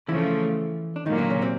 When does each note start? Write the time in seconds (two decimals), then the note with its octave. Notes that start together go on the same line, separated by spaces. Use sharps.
0.08 C#3 E3 F3 A3 E4
0.96 D4
1.06 A#2 D#3 F#3 A#3 D#4
1.18 D3 D4
1.30 C#3 C#4
1.42 C3 C4